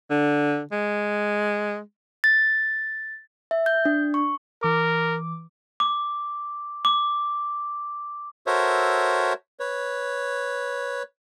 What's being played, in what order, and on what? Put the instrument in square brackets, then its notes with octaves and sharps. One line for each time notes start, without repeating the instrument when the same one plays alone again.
[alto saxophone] D3
G#3
[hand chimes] A6
E5
G6
D4
C#6
[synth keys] E3 D6 [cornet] A#4
[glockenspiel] D6
D6
[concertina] F#4 A4 A#4 C5 C#5 E5
B4 C#5